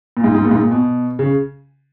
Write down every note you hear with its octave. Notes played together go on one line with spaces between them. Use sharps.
A#2
G#2
G#2
A#2
G#2
A#2
B2
C#3